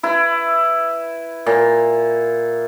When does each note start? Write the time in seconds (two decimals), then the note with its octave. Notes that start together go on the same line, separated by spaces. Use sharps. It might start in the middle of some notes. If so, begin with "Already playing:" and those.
0.03 E4 B4
1.46 A#2